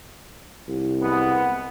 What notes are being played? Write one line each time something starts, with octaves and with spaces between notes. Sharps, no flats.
C2
G#3 B3